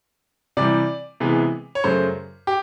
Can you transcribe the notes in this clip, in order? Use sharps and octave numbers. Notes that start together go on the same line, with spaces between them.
C3 E3 G3 D5
C3 E3 G#3 B3
C#5
F#2 C#3 F#3 A3 C5
G4